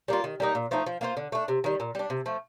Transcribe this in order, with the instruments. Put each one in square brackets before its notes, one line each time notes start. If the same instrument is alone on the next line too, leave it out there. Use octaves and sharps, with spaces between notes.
[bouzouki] G3 A#3 F4
D#3
G3 A#3 D#4
A#2
F3 A3 D#4
F3
A#3 F4 C5
D3
A3 D4
C3
D#3 G3
A#2
G3 D4
C3
F3 A3